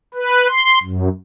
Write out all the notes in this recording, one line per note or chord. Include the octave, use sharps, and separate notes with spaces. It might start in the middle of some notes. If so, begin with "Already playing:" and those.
B4
C6
F#2